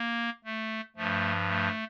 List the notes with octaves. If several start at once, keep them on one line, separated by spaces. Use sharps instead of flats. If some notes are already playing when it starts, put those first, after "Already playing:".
Already playing: A#3
A3
G2 F3 A3
A3